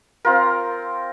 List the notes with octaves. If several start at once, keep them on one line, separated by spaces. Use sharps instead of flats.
C4 F4 A#4